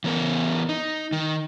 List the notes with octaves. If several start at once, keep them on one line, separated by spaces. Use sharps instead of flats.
E3 B3 A#4
D#4
D#3